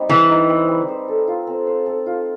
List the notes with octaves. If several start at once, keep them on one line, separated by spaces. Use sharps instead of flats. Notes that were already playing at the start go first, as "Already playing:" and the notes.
Already playing: G3 C4 D#4
E3 G#4
D#4
C4
G3
C5
A4
F4
C4
C5
A4
F4